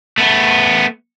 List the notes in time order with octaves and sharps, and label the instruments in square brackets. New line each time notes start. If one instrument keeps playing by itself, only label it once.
[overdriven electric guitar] A3 B3